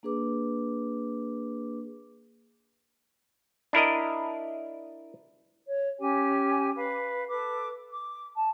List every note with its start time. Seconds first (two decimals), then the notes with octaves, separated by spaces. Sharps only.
0.03 A#3 D4 G#4 B4 D6
3.73 D4 E4 A#4 D#5
5.67 C#5
5.98 C#4 G4 G#5
6.75 B4 F5
7.27 A4 B4 D6
7.89 D6
8.35 A5